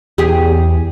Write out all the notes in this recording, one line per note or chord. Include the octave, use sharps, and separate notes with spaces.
E2 G4 G#4